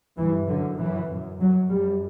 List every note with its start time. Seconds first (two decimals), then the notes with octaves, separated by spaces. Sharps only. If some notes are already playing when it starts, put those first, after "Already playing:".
0.17 G2 E3
0.48 F#2 D3
0.78 F#2 E3
1.09 F#2
1.41 F#2 F#3
1.70 F#2 G3